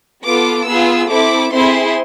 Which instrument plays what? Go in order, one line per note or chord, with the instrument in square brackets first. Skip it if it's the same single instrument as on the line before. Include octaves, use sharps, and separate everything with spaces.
[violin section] B3 F4 A4 D6
B3 F4 G#4 E6
C4 E4 A4 D6
C4 E4 G#4 C6